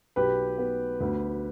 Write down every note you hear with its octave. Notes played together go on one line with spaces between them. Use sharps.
B1 G4 B4
B3
D2